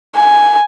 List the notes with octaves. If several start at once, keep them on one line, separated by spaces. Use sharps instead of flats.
G#5